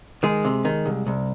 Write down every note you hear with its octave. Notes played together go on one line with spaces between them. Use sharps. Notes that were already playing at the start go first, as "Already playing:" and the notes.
D#3 G#3
C3
D#3
C2
C2